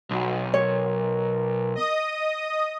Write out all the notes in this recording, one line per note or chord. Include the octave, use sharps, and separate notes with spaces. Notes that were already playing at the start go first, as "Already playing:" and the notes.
B1 F#4
A#4 C#5
D#5 D#6